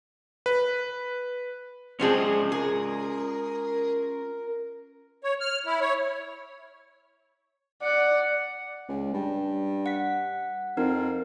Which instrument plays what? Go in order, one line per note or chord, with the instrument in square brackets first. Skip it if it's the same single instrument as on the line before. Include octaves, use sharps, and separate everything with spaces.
[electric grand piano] B4
[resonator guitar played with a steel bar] F3 C4 G#4 [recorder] G#3 [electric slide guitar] C#4 F4 D5
[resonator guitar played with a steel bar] G#4 [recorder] A#4
[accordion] C#5
F6
E4
C#5
[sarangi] D5 [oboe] F#5
[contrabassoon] C#2
G2
[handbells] F#5 B6
[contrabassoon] F2 [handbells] D#4 A#4